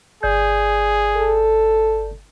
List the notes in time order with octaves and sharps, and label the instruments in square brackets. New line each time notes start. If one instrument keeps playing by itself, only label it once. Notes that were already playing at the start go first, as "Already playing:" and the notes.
[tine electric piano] G1 D5 G6 [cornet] G#4
[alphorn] A4